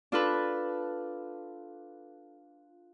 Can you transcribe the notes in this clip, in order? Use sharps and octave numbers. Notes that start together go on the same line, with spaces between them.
D4 F4 A4 B4